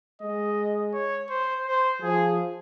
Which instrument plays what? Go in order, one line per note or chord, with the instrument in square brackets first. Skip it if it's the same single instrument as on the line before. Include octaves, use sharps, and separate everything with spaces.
[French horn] G#3 [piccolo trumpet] D#5
[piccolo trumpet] C#5
C5
C5
[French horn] F3 [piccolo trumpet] G#4